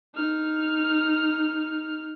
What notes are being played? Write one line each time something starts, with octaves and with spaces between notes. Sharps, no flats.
D#4 F6